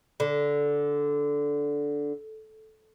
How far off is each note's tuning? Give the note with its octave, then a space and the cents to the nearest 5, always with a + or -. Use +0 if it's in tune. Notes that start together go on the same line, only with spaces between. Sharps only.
D3 -10